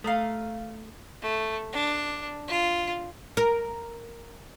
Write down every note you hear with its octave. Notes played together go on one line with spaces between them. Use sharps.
A3 F5 A#5 D#6
A3
D4
F4
A#4